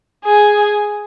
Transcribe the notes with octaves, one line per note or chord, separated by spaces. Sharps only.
G#4